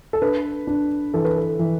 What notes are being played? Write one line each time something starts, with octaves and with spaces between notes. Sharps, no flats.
A4
D4 B4
D4
E3 A4
B4
A4
E3